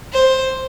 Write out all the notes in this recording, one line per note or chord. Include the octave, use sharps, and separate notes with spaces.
C5